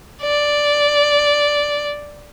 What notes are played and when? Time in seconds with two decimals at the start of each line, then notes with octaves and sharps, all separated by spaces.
0.22 D5